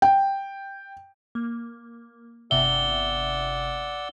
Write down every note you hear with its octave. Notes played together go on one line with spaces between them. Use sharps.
G5
A#3
G1 C3 D5 E5 F#5 E6 G7